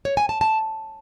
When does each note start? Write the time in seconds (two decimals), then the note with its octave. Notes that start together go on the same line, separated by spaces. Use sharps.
0.05 C#5
0.17 G#5
0.29 A5
0.41 A5